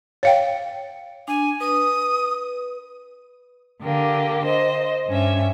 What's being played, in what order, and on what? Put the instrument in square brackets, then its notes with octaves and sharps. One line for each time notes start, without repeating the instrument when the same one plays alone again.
[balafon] C#5 F5 G5
[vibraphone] D4 [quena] G#5
[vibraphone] B4 [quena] D#6
[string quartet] D3 A#3 G4
C5 D#5
G2 C#4 E5